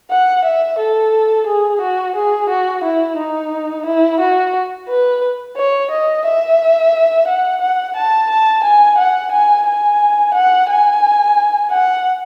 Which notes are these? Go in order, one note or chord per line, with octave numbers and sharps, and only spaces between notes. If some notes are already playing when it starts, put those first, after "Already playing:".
F#5
E5
A4
G#4
F#4
G#4
F#4
E4
D#4
E4
F#4
B4
C#5
D#5
E5
F#5
F#5
A5
A5
G#5
F#5
G#5
G#5
F#5
G#5
F#5